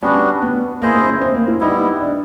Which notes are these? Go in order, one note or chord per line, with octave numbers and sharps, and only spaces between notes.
G3 B3 C#4 D4 F#4
B3
A#3 E4 G#4 C5 D#5
C4
C#4
C4
A#3
E4
G3 B3 D#4 E4
D4